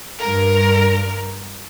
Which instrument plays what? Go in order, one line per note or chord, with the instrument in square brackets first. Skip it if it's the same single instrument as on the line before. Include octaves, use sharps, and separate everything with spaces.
[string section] G2 A#4